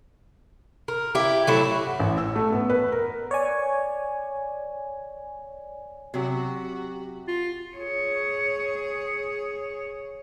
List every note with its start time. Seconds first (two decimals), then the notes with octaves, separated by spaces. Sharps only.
0.88 A#4
1.15 E4 G4
1.47 F#3 A3 E4
1.87 F#5
2.00 A1
2.18 E6
2.36 A3
2.52 B3
2.70 B4
2.92 A#4
3.31 C#5 D5 G#5
6.14 C3 F#3 F#4 G4
7.28 F4
7.76 G#4 C#5